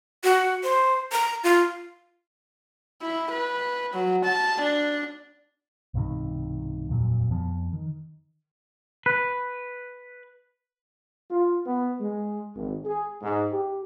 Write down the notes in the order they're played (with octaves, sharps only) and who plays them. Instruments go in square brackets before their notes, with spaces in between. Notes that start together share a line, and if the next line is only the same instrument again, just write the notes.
[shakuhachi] F#4
C5
A#5
F4
[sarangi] E4
B4
F#3
A5
D4
[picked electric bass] B1 G2 C3 D#3
D#1 F2 A#2 F#3
F2 F3 B3
D#3
[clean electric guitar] B4
[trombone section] F4
B3
G#3
G#1
G#4
G#2
G4